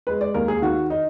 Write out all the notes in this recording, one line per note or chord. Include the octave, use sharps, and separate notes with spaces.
G#3 B4
D5
D#2 A#4
G#4
D#3 F#4
D#4